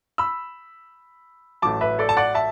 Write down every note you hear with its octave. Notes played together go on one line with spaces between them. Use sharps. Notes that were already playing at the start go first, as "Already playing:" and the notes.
B5 E6
A1 A2 F#3 A5 D6
B4 E5
A4 D5
A5
D5 F#5
E5 A5